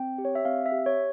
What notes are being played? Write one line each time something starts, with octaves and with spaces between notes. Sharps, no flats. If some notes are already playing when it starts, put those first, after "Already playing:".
Already playing: C4 G5
G4
C#5
E5
C4 F5
E5
G4
C#5